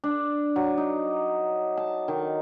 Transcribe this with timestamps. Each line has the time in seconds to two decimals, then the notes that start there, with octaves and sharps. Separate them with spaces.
0.04 D4
0.56 F#3
0.78 D#4
1.77 A5
2.08 D#3